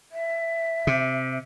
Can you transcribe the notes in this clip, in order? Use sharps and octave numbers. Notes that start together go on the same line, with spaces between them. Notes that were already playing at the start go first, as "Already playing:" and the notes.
E5
C3